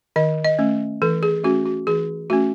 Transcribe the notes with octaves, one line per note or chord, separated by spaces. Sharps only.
D#3 D#5
D#5
A3 C#4
E3 A4
G#4
A3 C#4 F#4
F#4
E3 G#4
A3 C#4 F#4